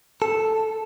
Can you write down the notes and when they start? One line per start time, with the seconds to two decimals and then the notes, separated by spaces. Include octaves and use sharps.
0.22 A4